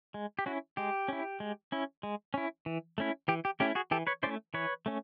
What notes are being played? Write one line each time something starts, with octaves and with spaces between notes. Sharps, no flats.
G#3
G4
C#4 E4 F#4
G#3 G4
C#4 E4
G#3
C#4 E4
G#3
C#4 E4
E3
A3 C#4 E4
E3 G4
G4
A3 C#4 E4 G4
F#4 G#4
E3 G4 A4
B4 C#5
A3 C#4 E4 C5 D5
E3 B4 C#5
A3 C#4